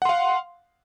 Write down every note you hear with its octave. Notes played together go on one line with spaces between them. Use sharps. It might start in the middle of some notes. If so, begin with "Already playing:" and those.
F5 F#5 C6